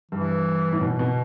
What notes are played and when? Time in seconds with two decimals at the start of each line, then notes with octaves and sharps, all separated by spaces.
0.11 G2 E3
0.73 A2
0.81 B2
0.99 B2